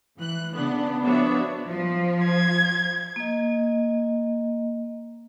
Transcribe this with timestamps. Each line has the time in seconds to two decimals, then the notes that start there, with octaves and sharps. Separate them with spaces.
0.18 E3 F#6
0.55 C#3 B3 D4
1.03 F3 B3 D4 F#4 C#5 E5
1.67 F3
2.26 G#6
3.16 A#3 D#5